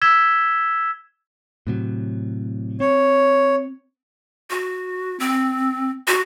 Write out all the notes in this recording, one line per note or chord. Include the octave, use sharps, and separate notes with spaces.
E6 G#6 B6 E7 G7
A2 C3 F#3
C4 C#5
F#4
C4
F#4